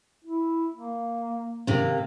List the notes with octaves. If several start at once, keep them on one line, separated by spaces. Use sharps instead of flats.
E4
A#3
C3 D#3 A#3